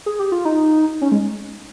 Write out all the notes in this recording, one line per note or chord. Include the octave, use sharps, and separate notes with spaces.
G#4
G4
F4
D#4
C#4
G#3